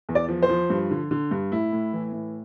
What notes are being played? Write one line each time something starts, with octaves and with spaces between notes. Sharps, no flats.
E2
D5
F3
C5
F3
G2
D3
D3
G2
A2 E4
A2
E3
A2